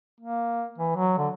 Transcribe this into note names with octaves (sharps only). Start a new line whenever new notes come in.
A#3
E3
F#3
D3